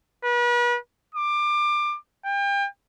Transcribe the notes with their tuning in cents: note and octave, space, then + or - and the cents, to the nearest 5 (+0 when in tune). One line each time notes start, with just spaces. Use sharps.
B4 -40
D6 +25
G5 +35